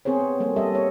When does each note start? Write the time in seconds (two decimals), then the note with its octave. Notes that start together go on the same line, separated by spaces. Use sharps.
0.05 B3 C4 G#4 C5 C#5
0.20 C4
0.40 G3 A#3 C4 A4
0.56 G3 A4 D#5 E5
0.75 C#5